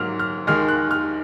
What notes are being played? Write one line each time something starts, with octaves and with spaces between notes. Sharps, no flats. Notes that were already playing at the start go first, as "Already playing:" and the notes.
Already playing: G#2 F#3 A#3 F6
F6
D#2 D#3 G#3 F6
F#6
F6